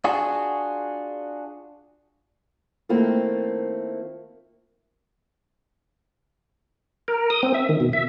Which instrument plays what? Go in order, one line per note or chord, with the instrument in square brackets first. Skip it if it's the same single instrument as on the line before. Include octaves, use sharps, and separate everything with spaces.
[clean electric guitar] D4 F4 F#4 G#4
[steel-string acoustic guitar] D#3 A3 A#3 C4 E4 F4
[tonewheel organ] A#4
D#6
C4
E5
D#3
B2
E5